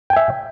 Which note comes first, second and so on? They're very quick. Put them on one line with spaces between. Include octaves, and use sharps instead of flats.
G5 G#5 E5